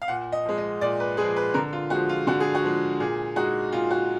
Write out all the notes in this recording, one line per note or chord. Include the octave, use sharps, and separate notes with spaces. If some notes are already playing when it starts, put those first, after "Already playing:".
F5
A#2 F#5
D#5
F3 G#3
D#5
A#2 D5
B4
F3 G#3 G#4
B4
D3 A#4
F4
F3 G#3 F#4
F4
D3 F#4
G#4
F#4
F3 G#3
A#2 G#4
G#3 D#4 F#4
A#2 F4
F#4